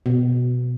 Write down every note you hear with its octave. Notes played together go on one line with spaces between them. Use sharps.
B2